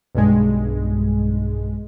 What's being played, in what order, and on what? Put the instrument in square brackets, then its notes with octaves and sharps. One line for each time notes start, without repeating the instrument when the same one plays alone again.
[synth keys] B1 G2 G#3